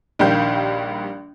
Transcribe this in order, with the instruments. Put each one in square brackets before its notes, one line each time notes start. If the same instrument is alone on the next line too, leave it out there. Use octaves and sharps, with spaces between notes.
[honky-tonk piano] A#1 D#3 G3 F5 G6